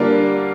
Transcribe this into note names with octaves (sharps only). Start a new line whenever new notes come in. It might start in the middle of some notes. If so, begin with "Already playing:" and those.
Already playing: D3 G3 A#3 D4 F4